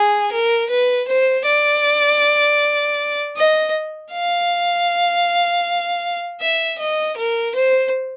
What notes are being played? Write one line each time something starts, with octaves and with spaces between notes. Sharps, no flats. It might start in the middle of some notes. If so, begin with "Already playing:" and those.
Already playing: G#4
A#4
B4
C5
D5
D#5
F5
E5
D#5
A#4
C5